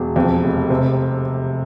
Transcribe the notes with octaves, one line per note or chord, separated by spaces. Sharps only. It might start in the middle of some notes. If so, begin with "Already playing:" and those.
Already playing: E1
F2
F1
C3